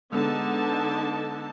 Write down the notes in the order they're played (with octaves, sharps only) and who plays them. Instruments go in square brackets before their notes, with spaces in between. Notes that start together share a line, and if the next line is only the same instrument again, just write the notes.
[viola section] D3 D#4 A5 [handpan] G#3 B3